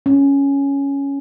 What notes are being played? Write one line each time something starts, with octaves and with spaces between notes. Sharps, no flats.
C#4